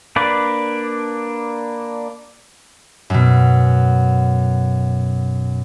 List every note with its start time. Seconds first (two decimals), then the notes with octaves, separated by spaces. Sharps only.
0.16 A#3 D4 B4 D5
3.10 F#2 B2